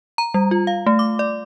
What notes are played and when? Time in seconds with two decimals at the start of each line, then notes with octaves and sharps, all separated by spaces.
0.18 A#5
0.34 G3
0.51 F4
0.67 F5
0.87 A3
0.99 D6
1.19 D5